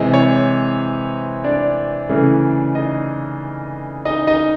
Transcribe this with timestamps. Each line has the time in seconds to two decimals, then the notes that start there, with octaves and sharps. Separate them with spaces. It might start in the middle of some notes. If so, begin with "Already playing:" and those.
Already playing: C3 E3 G#3 C5
0.14 C#5
1.44 D4 D5
2.09 C#3 E3 A3 C#4
2.75 D#4 D#5
4.05 D#4 D#5
4.27 D#4 D#5